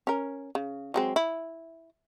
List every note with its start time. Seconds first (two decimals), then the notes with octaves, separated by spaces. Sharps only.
0.07 C#4 A#4
0.55 C#3
0.94 F#3 G#3 C4
1.16 E4